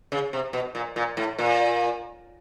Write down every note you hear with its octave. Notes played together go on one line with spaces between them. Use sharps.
C#3
C3
B2
A#2
A#2
A2
A#2